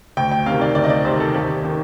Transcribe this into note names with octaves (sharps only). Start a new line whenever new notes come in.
D2 G5
G5
C3 D#3 F5
D5
D2 D5
D#5
D5
C3 D#3 C5
A4
D#2 G4
D#3